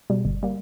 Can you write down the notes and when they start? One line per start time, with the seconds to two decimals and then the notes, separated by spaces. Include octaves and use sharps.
0.10 B2 G3
0.25 G1
0.43 G3 A#3